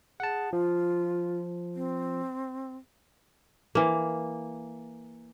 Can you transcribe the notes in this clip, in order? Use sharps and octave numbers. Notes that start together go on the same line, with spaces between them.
G#4 F#5 A5
F3 F4
C4
E3 A#3